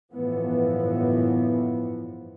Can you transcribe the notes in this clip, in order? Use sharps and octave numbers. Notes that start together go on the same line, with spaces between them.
G1 F#2 A2 E3 F3 B3